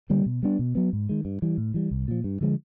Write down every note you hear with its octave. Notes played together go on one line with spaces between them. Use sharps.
D3 G3 A#3
B2
G3 B3 D4
B2
F#3 B3
G#2
D#3 G#3
G2
E3 G3
A2
E3 G3
C2
A#2 F3
G2
D3 F3 G#3